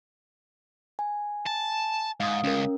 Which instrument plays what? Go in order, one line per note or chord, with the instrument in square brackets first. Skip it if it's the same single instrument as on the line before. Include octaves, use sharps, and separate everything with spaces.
[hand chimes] G#5
[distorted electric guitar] A5
[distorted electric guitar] G#2 [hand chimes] F5 D#6
[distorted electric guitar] C#2 [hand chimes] C#4 A#4